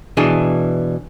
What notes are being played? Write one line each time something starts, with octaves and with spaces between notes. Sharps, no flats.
B2 E3 D4 G#4